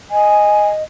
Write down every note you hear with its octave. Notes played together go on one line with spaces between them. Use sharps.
D#5 G#5